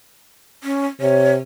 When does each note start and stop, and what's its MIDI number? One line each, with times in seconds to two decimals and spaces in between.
0.63 0.86 61
1.01 1.40 48
1.01 1.32 73